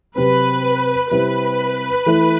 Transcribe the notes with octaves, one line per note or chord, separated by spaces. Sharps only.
C3 F#3 C4 B4
C3 G3 C4 E4 B4
E3 A3 E4